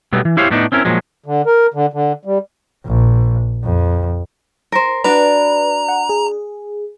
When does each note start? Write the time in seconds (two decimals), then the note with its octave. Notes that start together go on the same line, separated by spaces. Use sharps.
0.13 B2 F#3 G3 A3 B3
0.25 E3
0.37 E4 G4 C5 C#5 F5
0.51 A2 A3 B3 D4 D#4
0.72 C4 C#4 E4 A#4
0.85 A#2 F3 F#3 G#3
1.26 D3
1.46 A#4
1.74 D3
1.93 D3
2.25 G3
2.86 A#1
3.64 F2
4.72 A#4 C5
5.04 D4 F#4 B4 D5 A#5
5.88 F#5
6.09 G#4